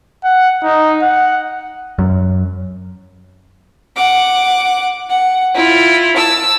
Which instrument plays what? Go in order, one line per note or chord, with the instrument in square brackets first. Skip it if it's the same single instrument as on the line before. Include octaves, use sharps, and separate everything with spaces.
[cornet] F#5
D#4
F#5
[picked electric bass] F#2
[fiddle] F#5 D6
F#5
E4 F4
A5 E6